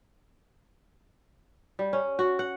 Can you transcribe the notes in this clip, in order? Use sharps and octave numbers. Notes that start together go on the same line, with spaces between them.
G3
C#4
F#4
F#5